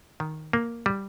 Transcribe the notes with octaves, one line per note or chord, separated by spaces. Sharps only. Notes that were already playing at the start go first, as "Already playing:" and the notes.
D#3
A#3
G3